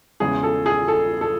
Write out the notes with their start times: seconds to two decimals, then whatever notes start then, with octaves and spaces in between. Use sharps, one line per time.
0.20 E2 C#3 G#3 G#4
0.43 A4
0.66 G#4
0.88 A4
1.21 A4